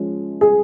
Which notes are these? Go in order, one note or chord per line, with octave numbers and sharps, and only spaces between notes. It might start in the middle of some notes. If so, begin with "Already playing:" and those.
Already playing: F3 G#3 C#4
G#4